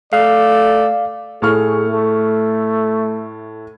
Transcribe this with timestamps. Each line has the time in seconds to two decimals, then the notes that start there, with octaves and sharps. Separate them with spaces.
0.13 A3 D5 F5
1.42 A2 G#4 C#6 F6
1.86 A3